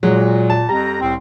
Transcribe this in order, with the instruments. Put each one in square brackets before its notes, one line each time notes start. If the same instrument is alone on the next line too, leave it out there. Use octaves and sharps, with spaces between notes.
[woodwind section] A#2 [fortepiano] F#3 G#3
[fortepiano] A5
[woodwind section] F2 A#5 [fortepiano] G3
[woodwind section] C2 A2 C4